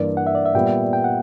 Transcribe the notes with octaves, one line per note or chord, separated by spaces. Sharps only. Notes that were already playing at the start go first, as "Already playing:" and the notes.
Already playing: G2 E3 A#3 D4 D5
F#5
E5
D5
E5
A#2 G3 B3 G5
G5
F#5